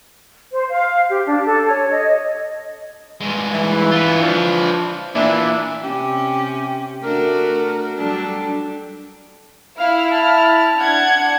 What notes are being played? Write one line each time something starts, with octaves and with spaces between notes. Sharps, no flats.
C5
F5
G4
D4
A4
C#5
D#5
G2 G#3
E3
F4 B4
F3 D4
A#2 E3 D4 E4
C3 C#4 G4
A3 D4 F#4 A#4
F#3 G3 D4 A4
E4 F5 F6
A5 F6
D4 F#5 G#6